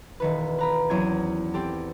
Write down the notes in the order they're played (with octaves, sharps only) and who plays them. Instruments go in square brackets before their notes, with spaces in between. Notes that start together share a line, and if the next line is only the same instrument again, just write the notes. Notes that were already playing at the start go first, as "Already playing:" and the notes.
[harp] E1 D#3 B4
B4 A#5 B5
E2 F#3 C4 C#4 G#6 D#7
C4 G4 A4